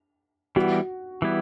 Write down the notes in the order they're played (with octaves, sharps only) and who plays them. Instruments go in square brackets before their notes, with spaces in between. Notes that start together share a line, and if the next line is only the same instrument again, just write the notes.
[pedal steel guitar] E3 G3 B3 E4 [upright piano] F#4
[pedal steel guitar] E3 G3 B3 E4